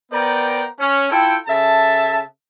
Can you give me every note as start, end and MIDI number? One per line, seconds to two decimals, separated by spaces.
0.12 0.64 59
0.12 0.64 70
0.12 0.64 72
0.12 0.64 74
0.12 0.64 79
0.12 0.64 82
0.80 1.06 61
1.11 1.36 64
1.11 1.36 65
1.11 1.36 69
1.11 1.36 79
1.47 2.19 49
1.47 2.19 69
1.47 2.19 76
1.47 2.19 81